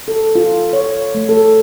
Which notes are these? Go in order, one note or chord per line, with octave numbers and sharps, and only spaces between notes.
A4
F4
C#5
A3
A4